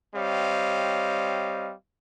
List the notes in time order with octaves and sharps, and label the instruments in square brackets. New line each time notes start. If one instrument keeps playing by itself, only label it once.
[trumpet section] G3 C4 C#5 D#5 F5